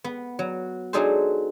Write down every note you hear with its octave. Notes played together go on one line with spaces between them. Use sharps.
B3
F#3
F#3 D4 D#4 G#4 A4 C5